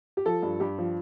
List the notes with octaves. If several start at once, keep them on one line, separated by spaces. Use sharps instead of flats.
G4
F3 A4
G2
G2 G4
F3